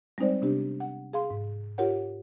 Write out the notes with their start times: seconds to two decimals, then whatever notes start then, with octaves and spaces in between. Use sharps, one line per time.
0.18 G3 G#3 C4 D#4 C5 D5
0.42 C3 B3 D4 G4
0.80 F#5
1.13 G#4 F5 C6
1.30 G#2
1.78 F4 G4 A#4 C#5 F#5